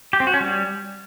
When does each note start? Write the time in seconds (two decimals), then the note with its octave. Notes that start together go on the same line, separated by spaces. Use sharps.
0.13 G4
0.20 C4
0.27 F#4
0.34 C#4
0.41 G3